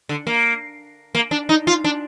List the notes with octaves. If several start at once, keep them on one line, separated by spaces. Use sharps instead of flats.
D3
A#3
A#3
D4
D#4
F4
D4